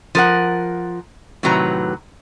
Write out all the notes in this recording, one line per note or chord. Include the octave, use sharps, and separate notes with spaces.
F3 A#4 F#5
A2 C3 D#3 F#3 B4 A#5